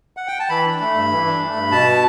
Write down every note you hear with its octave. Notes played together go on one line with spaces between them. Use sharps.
F#5
G5
A5
E3 B5
D4
A3
G2
E3
D4
A3
G2
B2 A5